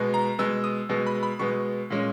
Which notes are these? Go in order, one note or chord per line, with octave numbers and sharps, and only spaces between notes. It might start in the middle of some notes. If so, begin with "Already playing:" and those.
Already playing: B2 G#3 B3
A#5
B2 G#3 B3 E6
D#6
B2 G#3 B3
B5
B5
B2 G#3 B3 C#6
A#2 G#3 C#4